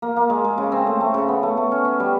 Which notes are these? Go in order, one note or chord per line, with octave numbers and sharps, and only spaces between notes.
A#3
A#3
G#3
G#3
C#3
C4
A3
A3
C#3
B3
A3
A3
C#4
C#4
G3